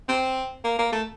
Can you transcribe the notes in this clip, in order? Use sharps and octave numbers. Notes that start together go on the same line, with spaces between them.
C4
A#3
A#3
A3